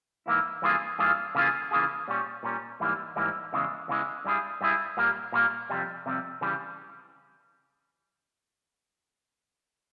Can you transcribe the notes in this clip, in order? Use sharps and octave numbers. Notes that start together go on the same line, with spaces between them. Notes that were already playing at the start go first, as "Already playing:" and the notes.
G#2 E3 A#3 E4
G2 E3 A#3 F4 G#4
G2 E3 A#3 F4 G#4
C#3 E3 A#3 F4 G#4
C#3 E3 A#3 F4 G#4
A#2 G3 C#4
A#2 G3 C#4
G#2 E3 G3 A#3
G#2 E3 G3 A#3
E2 C#3 E3 G#3
E2 C#3 E3 G#3
G2 G3 C#4 E4 G#4
G2 G3 C#4 E4 G#4
A#2 G3 A#3
A#2 G3 A#3
F2 C3 G3
F2 C3 G3
C#3 E3 G3